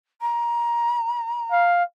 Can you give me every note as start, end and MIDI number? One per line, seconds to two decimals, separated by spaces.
0.21 1.63 82
1.52 1.84 77